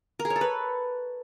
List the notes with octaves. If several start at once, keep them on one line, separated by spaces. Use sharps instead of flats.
A#4
G#4
C#5
A4
B4